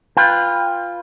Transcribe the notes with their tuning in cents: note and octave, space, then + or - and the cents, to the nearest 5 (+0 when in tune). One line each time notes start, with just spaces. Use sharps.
F4 +0 B4 +0 G5 +30